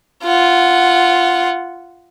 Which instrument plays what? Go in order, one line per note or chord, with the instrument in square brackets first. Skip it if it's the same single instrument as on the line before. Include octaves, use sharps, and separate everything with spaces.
[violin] F4 F#5